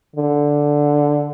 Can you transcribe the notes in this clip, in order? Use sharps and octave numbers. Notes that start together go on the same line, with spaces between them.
D3